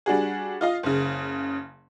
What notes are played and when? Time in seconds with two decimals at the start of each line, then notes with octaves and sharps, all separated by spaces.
0.06 G3 D4 F#4 G#4
0.61 F4 D#5 F5
0.83 F#1 C#3